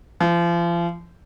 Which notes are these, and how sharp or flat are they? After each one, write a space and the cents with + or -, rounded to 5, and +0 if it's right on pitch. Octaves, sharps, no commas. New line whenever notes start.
F3 -35